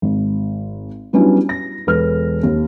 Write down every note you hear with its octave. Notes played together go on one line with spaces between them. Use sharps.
G#1
F#3 G3 B3 C#4 D4 E4
A#6
E1 A4 B4 F6
D#2